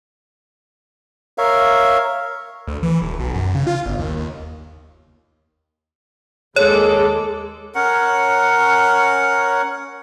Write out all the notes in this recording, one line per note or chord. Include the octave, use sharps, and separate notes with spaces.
A#4 C#5 E5 F5
D2
E3
D#1
B1
F#2
C#3
F4
G1
D#2
D#2
D#2 G#3 G#4 A4 C#5 D6
C#4 A#4 C#5 F#5